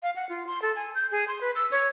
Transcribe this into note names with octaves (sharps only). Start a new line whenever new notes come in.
F5
F#5
F4
C6
A4
G#5
G6
G#4
C6
B4
E6
C#5